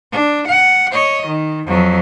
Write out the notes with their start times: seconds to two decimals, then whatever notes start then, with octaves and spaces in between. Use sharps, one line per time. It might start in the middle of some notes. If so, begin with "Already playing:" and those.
0.12 D4
0.48 F#5
0.92 C#5 D#5
1.26 D#3
1.67 F2 F#3